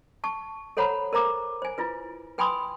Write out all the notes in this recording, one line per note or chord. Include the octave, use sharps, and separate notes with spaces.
A5 C#6
A4 C5 C#5 F#5 A#5 B5
A#4 C5 A#5 D6
C5 G#5
E4 F4 B4
B4 G5 G#5 B5 C6 D#6